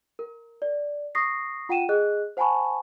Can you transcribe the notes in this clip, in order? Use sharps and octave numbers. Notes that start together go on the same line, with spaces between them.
A#4
D5
C#6 D#6 A#6 C7
F4 F#5 G5 D#7 E7
G#4 D#5 F#6
C5 F#5 G#5 A5 B5 C#6